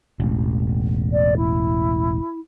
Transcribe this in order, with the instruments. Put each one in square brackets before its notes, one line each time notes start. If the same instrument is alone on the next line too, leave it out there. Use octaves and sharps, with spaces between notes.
[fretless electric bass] E1 A1
[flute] D5
E4